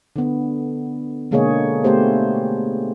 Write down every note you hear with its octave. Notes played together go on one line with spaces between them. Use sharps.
D3 B3
B2 D3 G#3 A#3 G#4 C#5
A3 B3 G4 C5